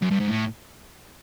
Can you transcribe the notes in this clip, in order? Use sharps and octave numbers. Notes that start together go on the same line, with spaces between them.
F#2
G2
G#2
A2